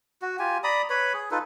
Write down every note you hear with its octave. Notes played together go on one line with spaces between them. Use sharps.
F#4
F4 G4 G#5
D5 A#5 B5 D#6
B4 C#5 B5
G#4
D#4 F4 A4 B4